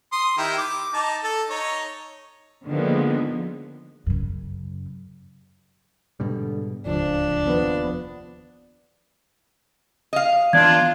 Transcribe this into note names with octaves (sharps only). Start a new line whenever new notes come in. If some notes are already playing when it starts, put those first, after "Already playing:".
C6 D#6
D#3 E4 G4
D6
D#4 A5 D6
A4
D#4 C#5
D3 D#3 F3 G#3 A#3 B3
F#2 C#3
G#2 B2 D3 G3
D1 C#2 F3 D4
F1 D#2 F3 B3
D#5 F5
E3 B3 D4 F4 D5 G#6